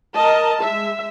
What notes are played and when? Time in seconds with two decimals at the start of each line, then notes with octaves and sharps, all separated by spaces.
0.14 A#4 D#5 A5
0.61 G#3 E5